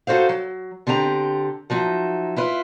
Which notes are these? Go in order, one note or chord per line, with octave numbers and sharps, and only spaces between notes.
D#4 F#4 A4 C5 F5
F#3
D3 C4 G4 G#5 A#5
F3 F#3 D#4 E5
E4 F4 B4